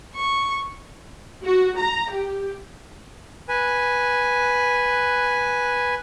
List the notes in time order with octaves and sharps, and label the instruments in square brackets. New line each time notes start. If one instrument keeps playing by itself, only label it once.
[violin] C#6
[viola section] F#4
A#5
G4
[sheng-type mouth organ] B4 G#5